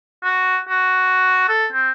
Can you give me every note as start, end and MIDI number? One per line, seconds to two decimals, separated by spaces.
0.24 0.58 66
0.69 1.47 66
1.49 1.66 69
1.73 1.91 60